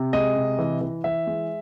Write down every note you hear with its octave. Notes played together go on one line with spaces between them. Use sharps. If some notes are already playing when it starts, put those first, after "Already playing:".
Already playing: C3
G#3 D#5
C3
E3
E3
E3 E5
G#3